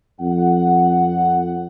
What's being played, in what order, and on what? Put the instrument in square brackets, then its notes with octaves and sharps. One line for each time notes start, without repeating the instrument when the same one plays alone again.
[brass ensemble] F2 F#5